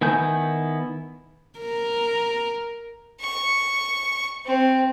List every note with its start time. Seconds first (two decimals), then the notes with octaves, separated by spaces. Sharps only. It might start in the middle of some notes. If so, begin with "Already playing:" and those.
0.01 D#3 B3 E4 G#5 G6
1.59 A#4
3.20 C#6
4.46 C4